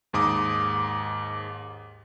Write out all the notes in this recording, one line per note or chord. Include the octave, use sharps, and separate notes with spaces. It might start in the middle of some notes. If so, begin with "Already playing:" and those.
D#2 G#2 D6 D#6